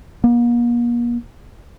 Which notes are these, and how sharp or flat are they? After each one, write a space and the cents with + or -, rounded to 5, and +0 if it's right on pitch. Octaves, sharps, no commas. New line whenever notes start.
A#3 +40